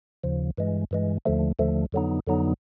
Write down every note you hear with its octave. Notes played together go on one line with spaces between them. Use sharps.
D#2 C#3 F3
G2 E3 G#3
G2 E3 G#3
D#2 D3 F3 A3
D#2 D3 F3 A3
F2 D3 F#3 B3 D#4
F2 D3 F#3 B3 D#4